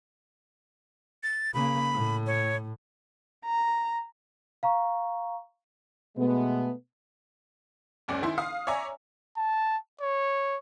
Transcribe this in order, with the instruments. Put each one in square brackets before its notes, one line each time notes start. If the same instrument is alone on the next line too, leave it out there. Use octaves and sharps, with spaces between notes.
[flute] A6
[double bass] C#3 A#3 [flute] B5
[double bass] A2
[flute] C#5
[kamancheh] A#5
[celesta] F5 A#5 C#6
[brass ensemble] B2 G#3 A3 B3
[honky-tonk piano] F#1 C#2 C#4 D5
D#3 E4 C6
F5 D#6
C#5 D5 E5 G#5 A#5
[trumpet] A5
C#5